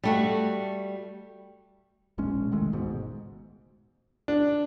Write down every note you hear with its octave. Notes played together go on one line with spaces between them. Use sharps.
G3 A3 F#4
E1 A#1 G#3 C#4
C2 D#3 G#3 A3
G#1 C#2 G#2 B2
D4